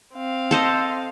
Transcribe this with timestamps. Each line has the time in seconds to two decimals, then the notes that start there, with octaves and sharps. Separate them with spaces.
0.15 C4 F5
0.51 A4 C5 D#5